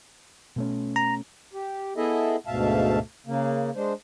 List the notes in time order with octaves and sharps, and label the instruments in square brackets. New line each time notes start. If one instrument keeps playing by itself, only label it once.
[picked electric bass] B2 A3 C#4
[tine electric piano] A#5
[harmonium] G4
B3 E4 G#4 A4 D#5 E5
D2 G#2 B2 E5 F5 A5
C#3 A#3
G#3 D4 C5